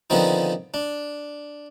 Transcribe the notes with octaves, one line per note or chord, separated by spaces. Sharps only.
D3 D#3 F3 B3 C4 D#4
D4